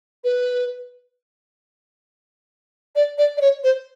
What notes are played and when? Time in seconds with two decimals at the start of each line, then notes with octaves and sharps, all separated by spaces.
0.24 B4
2.96 D5
3.18 D5
3.37 D5
3.41 C#5
3.64 C5